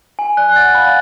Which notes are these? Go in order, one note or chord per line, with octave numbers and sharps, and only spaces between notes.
G#5
D5 F#6
F#5 A6
F5 B5
D5